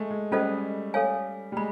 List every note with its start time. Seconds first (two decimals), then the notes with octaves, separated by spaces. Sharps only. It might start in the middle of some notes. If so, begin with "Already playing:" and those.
Already playing: G#3 A3
0.11 G#3
0.32 G3 C#4 F4 A4 C5 D#5
0.94 A4 C#5 F5 G#5
1.52 G3
1.57 G#3 B5